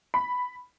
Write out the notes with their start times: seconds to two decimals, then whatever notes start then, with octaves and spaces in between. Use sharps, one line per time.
0.14 B5